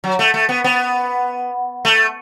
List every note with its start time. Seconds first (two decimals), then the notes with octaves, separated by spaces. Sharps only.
0.04 F#3
0.19 A3
0.34 A3
0.49 B3
0.64 B3
1.85 A3